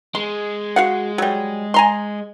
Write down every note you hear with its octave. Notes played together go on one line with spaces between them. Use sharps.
G#3 C6
F#4 F5 F#5
F#3 G3
G#5 A#5 C6